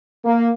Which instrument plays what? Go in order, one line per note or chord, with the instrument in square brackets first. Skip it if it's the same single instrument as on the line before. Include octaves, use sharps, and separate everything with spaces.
[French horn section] A#3